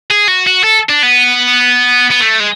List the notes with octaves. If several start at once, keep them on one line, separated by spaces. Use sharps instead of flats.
G#4
F#4
F#4
A4
D4
B3
B3
A3
G#3